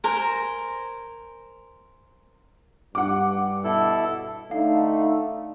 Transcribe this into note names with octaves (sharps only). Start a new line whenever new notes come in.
A#4 C5 G#5
G2 F#5 D6
B2 E4 A4
D3 A3 D#4 F5